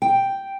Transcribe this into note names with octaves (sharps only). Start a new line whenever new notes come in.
G5